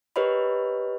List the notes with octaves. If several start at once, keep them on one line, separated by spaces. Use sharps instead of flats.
G4 A#4 B4 C#5 D#5 B5